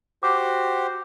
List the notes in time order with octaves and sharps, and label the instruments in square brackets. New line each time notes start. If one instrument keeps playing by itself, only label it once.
[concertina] F#4 G4 C5 [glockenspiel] D6